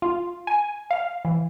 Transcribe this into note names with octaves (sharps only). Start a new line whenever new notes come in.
F4
G#5
F5
E3